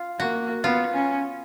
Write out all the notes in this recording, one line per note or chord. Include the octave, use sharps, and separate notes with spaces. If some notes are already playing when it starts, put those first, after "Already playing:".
Already playing: F4
A#3 F#4
B3 F4
C#4